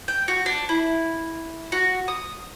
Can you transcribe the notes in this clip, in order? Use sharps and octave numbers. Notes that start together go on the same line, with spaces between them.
G5
F#4
D4
E4
F#4
D#6